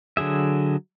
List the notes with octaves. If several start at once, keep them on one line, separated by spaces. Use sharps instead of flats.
D3 F#3 G#4 E5